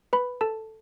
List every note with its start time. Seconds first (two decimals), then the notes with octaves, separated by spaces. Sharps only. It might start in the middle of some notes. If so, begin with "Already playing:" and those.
0.13 B4 B5
0.41 A4 A5